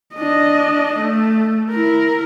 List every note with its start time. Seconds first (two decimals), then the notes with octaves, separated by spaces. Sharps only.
0.15 D4 D#5
0.99 A3
1.71 E4 A#4